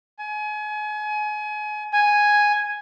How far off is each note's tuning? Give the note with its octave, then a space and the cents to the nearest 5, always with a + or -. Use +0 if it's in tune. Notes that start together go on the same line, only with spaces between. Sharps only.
G#5 +30
G#5 +0